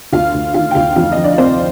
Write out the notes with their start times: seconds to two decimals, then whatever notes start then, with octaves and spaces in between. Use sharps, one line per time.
0.13 D2 F4 F5
0.34 D2
0.54 D#3 F4 F5
0.71 G5
0.75 D2 F4 F5
0.96 F2 F4 F5
1.12 F3 D#5
1.24 D4 D5
1.38 C3 C4 C5